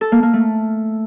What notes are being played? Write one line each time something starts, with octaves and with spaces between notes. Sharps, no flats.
A4
A#3
A#3
A3